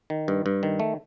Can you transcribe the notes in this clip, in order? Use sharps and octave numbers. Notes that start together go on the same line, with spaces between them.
D#3
G2
G2
D#3
A3